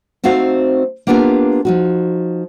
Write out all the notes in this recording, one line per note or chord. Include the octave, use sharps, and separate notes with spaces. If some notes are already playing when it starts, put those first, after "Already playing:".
A3 C4 D#4 F#4 C5 F5
A#3 B3 D4 F4 G4 A#4
F3 D#4 F#4